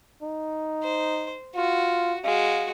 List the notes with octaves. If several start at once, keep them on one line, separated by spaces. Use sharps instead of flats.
D#4
C5
F4 F#4
G#3 F#4 F5